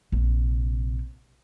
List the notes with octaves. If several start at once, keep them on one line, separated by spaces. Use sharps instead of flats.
A#1 C3